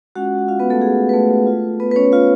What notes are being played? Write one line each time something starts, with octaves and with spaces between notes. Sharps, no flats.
G#3 C#4 F4 F#4 F#5
F#5
F4 F5
B3 B4
A3 A4
G#4
B4
A3 A4
A3 F4
B3 B4
B4
C#4 C#5
F4 F5